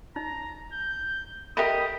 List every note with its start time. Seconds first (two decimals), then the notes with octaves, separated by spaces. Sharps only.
0.16 D#4 A#5
0.73 G6
1.57 G4 A4 A#4 D#5 E5 B5 D#6